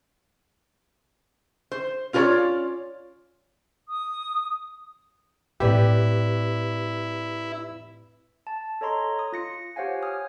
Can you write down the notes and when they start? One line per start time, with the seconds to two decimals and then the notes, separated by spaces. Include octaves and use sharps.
1.72 C5
2.13 C#4 F4 G#4 A#4 C#5 D5
3.89 D#6
5.60 A2 C4 E4 G4 B4 D5
8.47 A5
8.81 A4 C#5 D#5 A#5 C6
9.19 D#6
9.33 F4 A#6 C#7
9.76 G4 C5 C#5 F5 F#5 G#5
10.03 G#5 D#6 F6